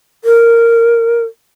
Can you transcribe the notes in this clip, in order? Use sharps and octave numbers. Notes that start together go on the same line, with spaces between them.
A#4